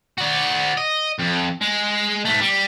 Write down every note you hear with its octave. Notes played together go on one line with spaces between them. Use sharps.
F#4 D5
D#5
F2
G#3
G#2 A3
G3